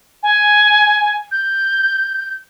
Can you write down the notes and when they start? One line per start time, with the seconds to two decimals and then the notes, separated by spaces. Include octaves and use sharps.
0.23 G#5
1.31 G6